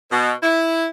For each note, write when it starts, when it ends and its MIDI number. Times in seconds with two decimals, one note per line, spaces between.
0.12 0.32 47
0.43 0.87 64